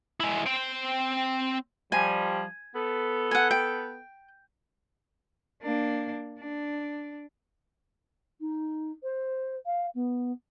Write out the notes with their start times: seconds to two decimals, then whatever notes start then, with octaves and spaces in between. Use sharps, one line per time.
0.20 G#3 E4
0.47 C4 G5
1.92 F3 G3 G#5
2.75 B3 A4
3.31 F#5 G#5
3.51 G5
5.63 A#3 D4
6.39 D4
8.40 D#4
9.03 C5
9.66 F5
9.94 B3